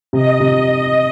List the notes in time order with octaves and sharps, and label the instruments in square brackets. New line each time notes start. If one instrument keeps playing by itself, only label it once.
[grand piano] C3 [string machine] D#5
[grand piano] C3